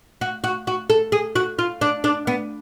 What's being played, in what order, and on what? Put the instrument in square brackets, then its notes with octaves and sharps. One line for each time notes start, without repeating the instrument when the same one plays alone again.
[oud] F#4
F#4
F#4
A4
G#4
F#4
F4
D4
D4
B3